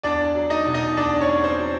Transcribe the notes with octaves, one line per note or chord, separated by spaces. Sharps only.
E2 D4 D5
F#3
D#4 D#5
B2
D#4 D#5
E2 D4 D5
C#4 C#5
E2
C4 C5
F#3